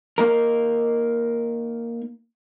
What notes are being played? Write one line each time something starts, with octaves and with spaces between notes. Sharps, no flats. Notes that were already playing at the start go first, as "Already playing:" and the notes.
A#3 D#4 A#4